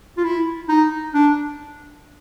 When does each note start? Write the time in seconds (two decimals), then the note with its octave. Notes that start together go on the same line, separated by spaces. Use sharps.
0.17 F4
0.24 E4
0.68 D#4
1.14 D4